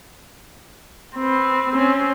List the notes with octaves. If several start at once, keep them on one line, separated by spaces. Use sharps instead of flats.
C4 B4
C4 C#4